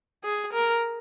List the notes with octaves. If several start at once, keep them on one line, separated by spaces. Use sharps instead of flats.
G#4
A#4